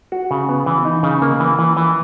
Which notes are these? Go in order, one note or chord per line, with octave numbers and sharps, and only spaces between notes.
F#4
C#3
B3
E3
D#4
C#3
A#3
E3
E3
E3